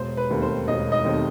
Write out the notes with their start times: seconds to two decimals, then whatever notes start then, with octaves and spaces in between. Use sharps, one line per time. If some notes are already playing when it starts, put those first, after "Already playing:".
Already playing: E1 C5
0.17 B4
0.30 D#2 D#3 A3 C4
0.42 C5
0.68 E1 D#5
0.92 D#5
1.05 D#2 D#3 A3 C4